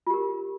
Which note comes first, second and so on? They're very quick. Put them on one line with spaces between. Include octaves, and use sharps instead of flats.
F4 G4 A#4